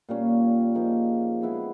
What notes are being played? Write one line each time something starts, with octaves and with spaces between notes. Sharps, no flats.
A#2 G3 A#3 C#4
F3 A#3 D#4 G#4
G#3 B3 E4 G#4